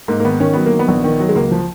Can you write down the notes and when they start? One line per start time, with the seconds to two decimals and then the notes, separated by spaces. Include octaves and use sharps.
0.08 G#2 A#3
0.20 A#3
0.24 D#3 B3
0.40 D#3 C#4
0.53 F#3 B3
0.66 A#3
0.72 D#3
0.79 B3
0.88 A#1
1.04 D#3
1.20 F#3
1.29 G#3
1.36 C#2 A#3
1.51 F3